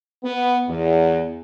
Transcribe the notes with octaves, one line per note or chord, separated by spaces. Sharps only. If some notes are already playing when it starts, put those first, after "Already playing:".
B3
E2